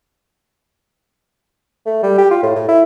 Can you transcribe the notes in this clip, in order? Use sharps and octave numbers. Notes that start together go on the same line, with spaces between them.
A3
G3
G4
F4
A2
A2
E4